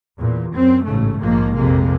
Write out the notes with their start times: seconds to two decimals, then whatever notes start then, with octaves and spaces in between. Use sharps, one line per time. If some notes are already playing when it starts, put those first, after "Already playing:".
0.20 E2 A#2
0.55 F#2 C4
0.86 A1 G#2 C#3 A3
1.20 A#1 G#2 D#3 F3 A#3
1.57 F2 C3 G#3 A#3